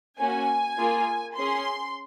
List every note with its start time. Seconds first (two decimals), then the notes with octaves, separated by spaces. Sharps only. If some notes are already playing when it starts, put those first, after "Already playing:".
0.19 A#3 C#4 F#4 G#5
0.78 A#3 F4 G#4
1.37 C#4 G#4 C6